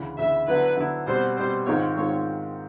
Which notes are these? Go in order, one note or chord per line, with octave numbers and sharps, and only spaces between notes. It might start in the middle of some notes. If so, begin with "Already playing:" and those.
Already playing: D2 C#3 E3
D2 C#3 E3 E5
D3 F#3 B3 E4 B4
D3 F#3 B3 E4
B2 G3 C4 C5
B2 G3 C4 C5
G#2 D#3 G#3 C4 F4 C#5
G#2 D#3 G#3 C4 F4 C#5